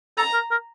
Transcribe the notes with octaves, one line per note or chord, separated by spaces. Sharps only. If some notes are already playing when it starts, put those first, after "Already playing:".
A4 A#5
A#4
A#4